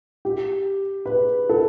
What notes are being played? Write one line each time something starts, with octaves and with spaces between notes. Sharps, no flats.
G4
B4
A4